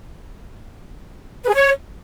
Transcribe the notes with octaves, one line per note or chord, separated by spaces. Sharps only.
B4
G#4
C#5